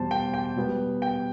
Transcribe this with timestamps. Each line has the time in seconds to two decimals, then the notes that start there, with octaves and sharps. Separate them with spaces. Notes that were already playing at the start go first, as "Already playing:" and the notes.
Already playing: E2 B2 G3 C5 A5
0.11 G5
0.34 G5
0.56 B2 G3 B3
1.02 G5